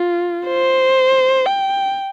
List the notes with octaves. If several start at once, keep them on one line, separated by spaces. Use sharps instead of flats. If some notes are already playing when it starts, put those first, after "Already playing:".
Already playing: F4
C5
G5